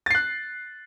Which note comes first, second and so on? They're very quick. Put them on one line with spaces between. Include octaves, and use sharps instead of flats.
A6 C7 F#6